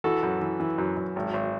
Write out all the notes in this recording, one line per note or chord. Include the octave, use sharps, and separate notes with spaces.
E3 F#4 A4
F#2
E3
E3
F#2
F#2
G#1
G#1